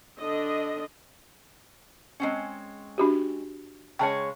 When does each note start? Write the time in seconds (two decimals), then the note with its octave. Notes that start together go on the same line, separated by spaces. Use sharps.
0.20 D3 D4 D#5
2.20 G#3 C4 C#4
2.98 D4 F#4 G4
3.99 C#3 G#3 C#5 G5 A5